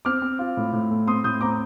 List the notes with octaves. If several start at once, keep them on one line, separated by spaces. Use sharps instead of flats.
C4 D6 F6
C4
F4
A2
A2
A3
C4 C6 D#6
A2 D#6 G6
C4 A#5 D6